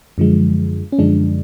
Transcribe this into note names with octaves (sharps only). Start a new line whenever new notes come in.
F#2 D3 F3 G#3
C#4
F#2 D3 F3 G#3 D4